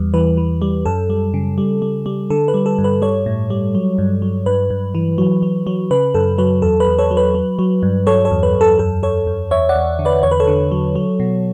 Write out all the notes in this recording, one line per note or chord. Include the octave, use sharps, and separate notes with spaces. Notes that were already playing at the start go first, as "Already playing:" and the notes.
Already playing: E2 G3
E3 B4
E3
G3
F#2 A4
G3
C#3
G3
G3
G3
D3 A4
B4
G3
A4
G2
B4
G3 A4 C#5
A2
G3
F#3
G2
F#3
G2 B4
G2
E3
F#3
F#3
F#3
C#3 B4
F#2 A4
F#3 B4
E2 A4
B4
E2
A4 C#5
F#3
B4
F#3
F#3
G2
F#3 A4 C#5
A4 C#5
E2
B4
E2
A4
F#2 A4
F#2 A4 C#5
F#2
E2 C#5 E5
D5 F#5
E2
D3
B4 D5
E2 C#5
B4
A4 C#5
D3
F#3
F#3
B2